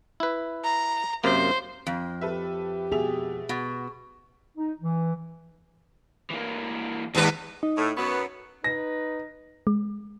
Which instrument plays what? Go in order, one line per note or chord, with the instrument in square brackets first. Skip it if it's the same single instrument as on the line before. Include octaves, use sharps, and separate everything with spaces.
[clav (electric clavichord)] E4 B4
[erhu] A#5
[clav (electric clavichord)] F#2 C3 A#3 [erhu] C5
[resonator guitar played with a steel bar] F2
[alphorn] G4 [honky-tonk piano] A4 B4 E5
[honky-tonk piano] B2 E5 F7 [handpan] G#4
[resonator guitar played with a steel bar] B2 [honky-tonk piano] F#4
[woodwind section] D#4
E3
[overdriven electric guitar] E3 A#3
[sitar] D#2 B3 B4 [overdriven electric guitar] G#2
[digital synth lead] D#4
[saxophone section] A2
[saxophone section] F#2 F#3 B3 [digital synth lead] C#6
[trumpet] D#4 [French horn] B4 [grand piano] A#6
[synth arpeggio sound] G#3